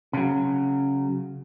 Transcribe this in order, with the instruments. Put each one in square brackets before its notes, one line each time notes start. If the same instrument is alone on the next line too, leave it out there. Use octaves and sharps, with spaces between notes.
[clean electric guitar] C#3 F#3